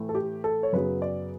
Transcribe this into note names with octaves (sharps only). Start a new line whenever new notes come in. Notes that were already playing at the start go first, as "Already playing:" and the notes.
Already playing: A2 E3 A3
A4
G4
A4
C#5
F#2 C#3 F#3 B3 B4
D5